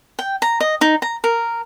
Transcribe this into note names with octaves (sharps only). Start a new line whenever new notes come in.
G5
A#5
D#5
D#4
A#5
A#4